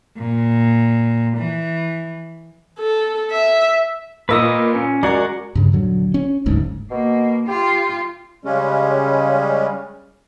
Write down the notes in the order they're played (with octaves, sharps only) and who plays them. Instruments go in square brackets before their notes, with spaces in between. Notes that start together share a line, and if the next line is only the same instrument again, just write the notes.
[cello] A#2
E3
[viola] A4
E5
[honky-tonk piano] A#2 A#3 E6 [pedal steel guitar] B4 D#5 D#6
[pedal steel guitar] C#4
[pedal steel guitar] G#3 F#4 A#4 [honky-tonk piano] D5
[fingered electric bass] G2 C#3
D#1 D3 F#3
C#4
F#1 D2 G#2
[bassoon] B2 [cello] A#3
[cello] F4 [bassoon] G4
[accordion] C#3 G3 G#3 C#4